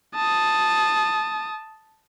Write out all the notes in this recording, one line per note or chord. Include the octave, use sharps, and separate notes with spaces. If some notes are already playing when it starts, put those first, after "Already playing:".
A5 D#6